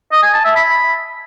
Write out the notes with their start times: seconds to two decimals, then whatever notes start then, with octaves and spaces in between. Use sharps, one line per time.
0.12 D#5
0.23 G#5
0.34 A5
0.45 E5
0.56 B5